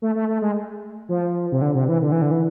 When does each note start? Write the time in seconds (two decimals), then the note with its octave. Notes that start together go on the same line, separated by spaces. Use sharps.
0.02 A3
0.16 A3
0.29 A3
0.42 G#3
1.09 F3
1.52 C3
1.62 D3
1.75 C3
1.88 E3
2.02 D3
2.12 E3
2.22 D3
2.31 E3